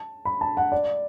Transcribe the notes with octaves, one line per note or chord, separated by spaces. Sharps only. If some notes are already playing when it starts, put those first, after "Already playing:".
Already playing: A5
B5
A5
F#5
D5